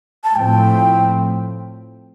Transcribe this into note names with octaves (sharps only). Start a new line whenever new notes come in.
A5
A2 F3 A3 C4 G5